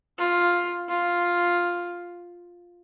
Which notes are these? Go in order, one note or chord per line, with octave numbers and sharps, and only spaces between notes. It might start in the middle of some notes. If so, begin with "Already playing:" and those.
F4
F4